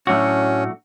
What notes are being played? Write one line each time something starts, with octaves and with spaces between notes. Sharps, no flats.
A2 F#3 A3 C#4 D4 F#4